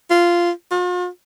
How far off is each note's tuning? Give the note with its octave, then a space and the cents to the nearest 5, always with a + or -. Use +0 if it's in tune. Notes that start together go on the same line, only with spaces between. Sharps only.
F4 -10
F4 +45